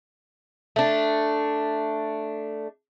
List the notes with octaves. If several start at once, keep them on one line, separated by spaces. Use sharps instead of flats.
A3 D4